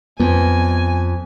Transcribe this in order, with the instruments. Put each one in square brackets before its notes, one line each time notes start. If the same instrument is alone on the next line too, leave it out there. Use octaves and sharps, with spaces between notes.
[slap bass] F2 [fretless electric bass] B3 [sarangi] G#5